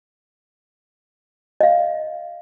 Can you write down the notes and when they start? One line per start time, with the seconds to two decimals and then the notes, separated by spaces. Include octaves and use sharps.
1.61 D#5 F5